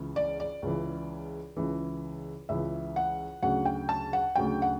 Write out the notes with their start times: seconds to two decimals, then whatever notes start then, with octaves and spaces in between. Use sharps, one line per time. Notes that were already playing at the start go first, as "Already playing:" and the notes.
Already playing: C#2 C#3 E3
0.16 D5
0.40 D5
0.62 C#2 C#3 E3
1.57 C#2 C#3 E3
2.49 C#2 C#3 E3 E5
2.96 F#5
3.43 D2 C#3 F#3 F#5
3.65 G5
3.89 A5
4.13 F#5
4.35 D2 C#3 F#3 G5
4.62 F#5